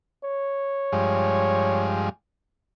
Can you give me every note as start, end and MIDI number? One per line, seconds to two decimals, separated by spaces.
0.25 1.95 73
0.92 2.09 43
0.92 2.09 53
0.92 2.09 56